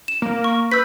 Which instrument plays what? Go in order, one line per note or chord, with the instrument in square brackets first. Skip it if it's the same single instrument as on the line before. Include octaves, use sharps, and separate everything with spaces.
[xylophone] E7
[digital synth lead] A#3
[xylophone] C#6
[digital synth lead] B4 [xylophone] E6 G6 B6